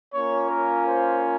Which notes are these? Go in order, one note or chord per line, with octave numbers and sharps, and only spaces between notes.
A#3 C#4 F4 C#5
A#4
C5